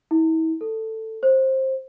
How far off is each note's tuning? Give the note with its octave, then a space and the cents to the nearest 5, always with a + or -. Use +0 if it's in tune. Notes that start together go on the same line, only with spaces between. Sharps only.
E4 -40
A4 +10
C5 +20